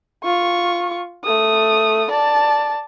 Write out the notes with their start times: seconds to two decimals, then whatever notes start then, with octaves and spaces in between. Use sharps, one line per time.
0.24 F4 C#6
1.24 A3 D#6
2.11 D5 A5